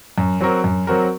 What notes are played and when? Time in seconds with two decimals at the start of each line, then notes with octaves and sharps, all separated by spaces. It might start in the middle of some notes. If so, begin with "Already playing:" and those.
0.18 F#2
0.40 F#3 C4 F#4 A#4
0.64 F#2
0.87 F#3 C4 F#4 A#4